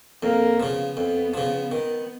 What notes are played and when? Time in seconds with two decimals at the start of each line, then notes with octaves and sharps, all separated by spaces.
0.22 F2 A#3
0.59 C#3 F3 B3
0.97 F2
1.34 C#3 F3
1.72 D#3 B3